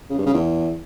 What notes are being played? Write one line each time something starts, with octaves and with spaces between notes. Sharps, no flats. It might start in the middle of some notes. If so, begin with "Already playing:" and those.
C#3
G2
C#3
E2